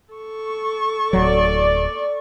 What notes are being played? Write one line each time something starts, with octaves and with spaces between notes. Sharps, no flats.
A4 C#6
D1 F#3 D5